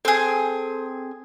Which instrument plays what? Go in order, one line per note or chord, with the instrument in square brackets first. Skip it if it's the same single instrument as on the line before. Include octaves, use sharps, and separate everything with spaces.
[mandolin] C4 G#4 [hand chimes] A4